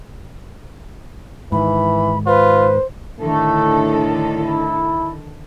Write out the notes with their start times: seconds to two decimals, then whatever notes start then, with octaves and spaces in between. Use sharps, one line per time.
1.52 G#2 D#3 E3 B5
2.27 F4 B4 C5
3.20 A2 D3 D#3 A3 A4
4.40 E4